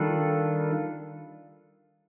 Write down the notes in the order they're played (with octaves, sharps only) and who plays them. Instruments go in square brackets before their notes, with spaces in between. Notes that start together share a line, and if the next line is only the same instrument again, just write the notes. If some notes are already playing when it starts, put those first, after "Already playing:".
Already playing: [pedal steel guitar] D#3 G3 D4 F4 A4